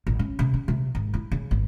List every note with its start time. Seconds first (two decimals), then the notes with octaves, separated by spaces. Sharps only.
0.07 A1
0.19 C#4
0.39 C3
0.54 C#4
0.68 C3
0.95 G#1
1.14 E4
1.32 C#3
1.51 G#1